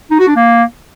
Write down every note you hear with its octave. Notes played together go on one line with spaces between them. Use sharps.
D#4
F#4
D4
A#3